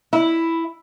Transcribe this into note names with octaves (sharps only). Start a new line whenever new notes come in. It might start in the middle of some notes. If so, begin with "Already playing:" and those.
E4